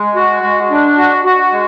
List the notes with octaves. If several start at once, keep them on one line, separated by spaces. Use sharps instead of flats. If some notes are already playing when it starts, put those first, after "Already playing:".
Already playing: G#3
F#4
G#3
D4
F#4
F#4
G#3